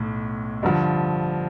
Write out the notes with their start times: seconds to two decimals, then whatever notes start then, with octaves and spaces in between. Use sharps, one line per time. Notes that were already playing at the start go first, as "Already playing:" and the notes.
Already playing: B1 A2
0.63 G2 D3 F3